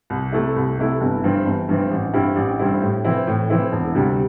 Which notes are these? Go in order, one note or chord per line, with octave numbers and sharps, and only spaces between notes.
C2
C3 A3 E4
C2
C3 A3 E4
G1
G2 E3 C4
G1
G2 E3 C4
A1
G2 G3 C4 E4
A1
G2 G3 C4 E4
A2
E3 C4 E4
A2
E3 C4 E4
E1
D2 C3 G3